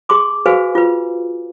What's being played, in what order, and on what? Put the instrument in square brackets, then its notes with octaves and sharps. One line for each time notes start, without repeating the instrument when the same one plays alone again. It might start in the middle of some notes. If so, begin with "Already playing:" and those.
[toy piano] G#4 A5 C6 D6
F#4 G#4 B4 C5 F5 G#5
F4 B4